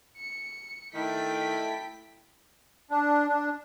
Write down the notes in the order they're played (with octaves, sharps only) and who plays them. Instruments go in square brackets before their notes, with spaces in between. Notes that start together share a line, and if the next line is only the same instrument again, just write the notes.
[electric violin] C#7
[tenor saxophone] D#3 [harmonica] A3 A4 [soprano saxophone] E4 [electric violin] G5 B6
[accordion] D4
D4